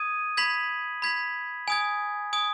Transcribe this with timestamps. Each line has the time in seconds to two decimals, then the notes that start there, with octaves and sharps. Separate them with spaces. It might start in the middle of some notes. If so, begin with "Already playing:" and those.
Already playing: D#6 G#6 D#7
0.37 B5 G#6 B6 F#7
1.02 B5 G#6 B6 F#7
1.68 G#5 D#6 G#6
2.33 G#5 D#6 G#6